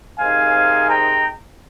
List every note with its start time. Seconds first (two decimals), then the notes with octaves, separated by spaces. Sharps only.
0.19 C3 D#3 G#3 C4 D#4 F5 G#5
0.89 G5 A#5